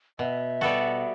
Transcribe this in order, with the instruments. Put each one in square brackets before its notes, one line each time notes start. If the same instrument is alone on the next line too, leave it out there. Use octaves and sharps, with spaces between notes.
[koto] B2 [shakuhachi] E5
[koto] G3 B3 F#4 A4